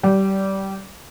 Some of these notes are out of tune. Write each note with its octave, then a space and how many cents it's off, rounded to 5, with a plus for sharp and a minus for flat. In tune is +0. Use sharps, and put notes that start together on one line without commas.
G3 -20